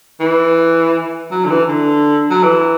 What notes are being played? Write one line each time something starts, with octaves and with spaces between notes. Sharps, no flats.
E3
F#3
D3
E3
D3
F#3
E3